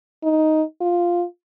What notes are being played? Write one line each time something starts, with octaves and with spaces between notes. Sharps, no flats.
D#4
F4